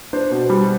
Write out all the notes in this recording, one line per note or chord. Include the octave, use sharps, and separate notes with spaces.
D4 C5
B2
G3